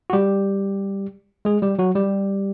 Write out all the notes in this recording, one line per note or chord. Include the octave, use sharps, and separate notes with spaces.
F#4
G3 G4
G#3 G#4
G3 G4
F#3 F#4
G3 G4